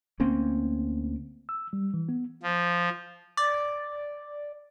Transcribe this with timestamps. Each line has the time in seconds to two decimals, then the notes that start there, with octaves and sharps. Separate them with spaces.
0.20 D2 A#3 C4 C#4
1.49 E6
1.73 G3
1.94 E3
2.09 B3
2.43 F3
3.37 D5